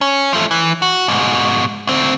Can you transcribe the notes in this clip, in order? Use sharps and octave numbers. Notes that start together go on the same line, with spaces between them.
C#4
F3 A3
E3
F#4
G#2 B2
D2 C4